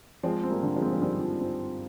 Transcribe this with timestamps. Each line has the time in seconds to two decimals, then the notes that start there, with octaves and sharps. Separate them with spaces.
0.23 F3 G#3 C4
0.44 C4
0.49 G3 A#3
0.63 D3
0.76 F3 G#3
0.82 C4
0.93 F3
1.01 D#3 G3 C4
1.20 F3
1.40 C4